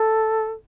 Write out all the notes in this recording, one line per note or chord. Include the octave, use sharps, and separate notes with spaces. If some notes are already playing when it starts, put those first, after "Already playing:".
Already playing: A4